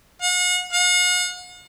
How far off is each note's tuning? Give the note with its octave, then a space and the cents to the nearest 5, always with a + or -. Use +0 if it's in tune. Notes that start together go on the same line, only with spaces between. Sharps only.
F#5 -40
F#5 -45